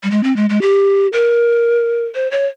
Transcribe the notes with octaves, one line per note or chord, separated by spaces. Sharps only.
G3
G#3
C4
G#3
G#3
G4
A#4
C5
C#5